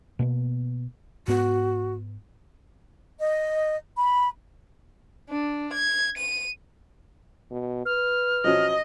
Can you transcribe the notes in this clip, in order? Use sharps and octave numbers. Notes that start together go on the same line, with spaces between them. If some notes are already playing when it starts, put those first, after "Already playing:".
B2 A#3 B3
G#2 B3 F#4
D#5
B5
D4
G#6
D#7
B2
B4 F6
F3 F#3 C#4 D#5